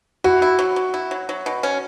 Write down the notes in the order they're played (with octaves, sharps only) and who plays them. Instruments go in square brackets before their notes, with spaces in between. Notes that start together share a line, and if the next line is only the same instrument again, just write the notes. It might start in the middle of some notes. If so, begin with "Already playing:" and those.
[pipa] E4 [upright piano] F#4
[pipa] E4
F#3
F#3
E4
F#3
F#3
B2
C#4